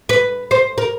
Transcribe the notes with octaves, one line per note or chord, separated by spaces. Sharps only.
B4
C5
A#4